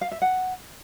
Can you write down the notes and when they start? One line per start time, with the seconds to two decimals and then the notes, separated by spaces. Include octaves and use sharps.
0.01 F5
0.12 E5
0.22 F#5